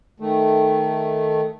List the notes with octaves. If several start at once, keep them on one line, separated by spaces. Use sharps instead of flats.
D#3 A3